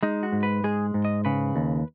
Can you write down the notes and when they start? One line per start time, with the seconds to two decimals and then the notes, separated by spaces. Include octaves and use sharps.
0.03 G#3 D#4
0.23 F#4
0.32 G#2
0.43 B4
0.64 G#3 G#4
0.94 G#2
1.05 D#5
1.25 C#3 B4
1.56 D#2